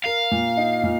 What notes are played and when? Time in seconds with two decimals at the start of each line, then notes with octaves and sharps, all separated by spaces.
0.05 A#4 F5
0.31 A#2
0.57 D#4
0.83 A#2